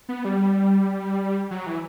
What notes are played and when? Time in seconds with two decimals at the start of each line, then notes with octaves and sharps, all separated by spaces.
0.09 B3
0.25 G3
1.51 F#3
1.66 E3